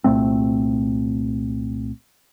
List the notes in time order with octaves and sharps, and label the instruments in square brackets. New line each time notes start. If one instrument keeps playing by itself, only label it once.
[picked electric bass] C2 A#2 A3 C4